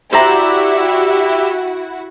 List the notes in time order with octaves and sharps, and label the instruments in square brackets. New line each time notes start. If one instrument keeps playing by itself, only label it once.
[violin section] E4 F#4 [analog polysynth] G4 E5 [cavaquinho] C5 D5 A#5